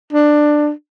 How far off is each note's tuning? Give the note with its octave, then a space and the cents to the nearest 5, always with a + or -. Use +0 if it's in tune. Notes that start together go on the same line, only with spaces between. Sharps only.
D4 +15